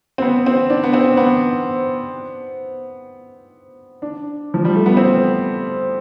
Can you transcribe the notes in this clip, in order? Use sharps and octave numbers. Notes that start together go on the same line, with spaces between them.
C4
B3
C4
D4
B3
C4
B3
D4
F3
G3
A3
B3
C4